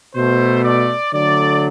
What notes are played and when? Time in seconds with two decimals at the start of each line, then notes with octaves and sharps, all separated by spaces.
0.15 B2 A3 C5
0.64 D5
1.13 D3 F#3 A3 D5